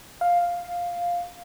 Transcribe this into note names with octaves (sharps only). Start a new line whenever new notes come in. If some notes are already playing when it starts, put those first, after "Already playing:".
F5